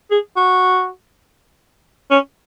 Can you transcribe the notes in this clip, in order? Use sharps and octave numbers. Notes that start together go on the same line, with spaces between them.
G#4
F#4
C#4